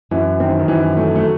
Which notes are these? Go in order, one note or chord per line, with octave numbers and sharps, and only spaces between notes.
F#2 E3
D#3 C4
D#3
F#2 E3
F#3 A3
A3